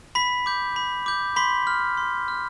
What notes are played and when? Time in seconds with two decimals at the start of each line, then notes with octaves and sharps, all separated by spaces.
0.15 B5 B6
0.46 D6 G6
0.76 B5
1.06 D6 G6
1.36 B5 C6 B6
1.67 F6
1.97 C6
2.28 F6